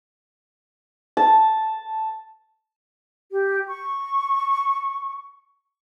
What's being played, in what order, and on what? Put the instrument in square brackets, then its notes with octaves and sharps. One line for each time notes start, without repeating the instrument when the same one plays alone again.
[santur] A5
[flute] G4
C#6